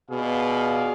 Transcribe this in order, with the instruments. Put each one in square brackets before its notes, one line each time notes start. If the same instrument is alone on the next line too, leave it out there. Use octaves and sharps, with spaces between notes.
[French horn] B2 [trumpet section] F4 G#4 D5 F5